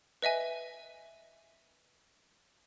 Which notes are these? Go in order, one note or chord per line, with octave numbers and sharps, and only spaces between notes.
B4 D#5 E5 G#5